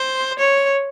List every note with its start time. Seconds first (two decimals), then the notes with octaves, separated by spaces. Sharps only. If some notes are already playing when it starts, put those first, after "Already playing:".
Already playing: C5
0.39 C#5